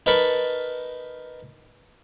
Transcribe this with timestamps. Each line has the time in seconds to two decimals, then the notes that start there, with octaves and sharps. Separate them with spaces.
0.06 D#4 A#4 B4 A5 B5 C#6